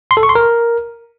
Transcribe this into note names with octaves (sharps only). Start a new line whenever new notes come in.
C6
A4
C#6
C6
A#4